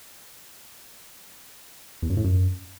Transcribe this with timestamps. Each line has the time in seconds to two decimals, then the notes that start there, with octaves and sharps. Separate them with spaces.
2.02 E2
2.10 F#2
2.17 A2
2.24 F#2